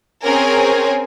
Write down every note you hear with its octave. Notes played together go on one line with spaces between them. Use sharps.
C4 C#4 G#4 A#4 C#5 G#5